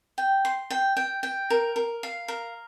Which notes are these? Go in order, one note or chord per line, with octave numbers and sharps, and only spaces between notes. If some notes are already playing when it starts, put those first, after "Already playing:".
G5
C6
G5
G5
G5
A#4
A#4
F5
A#4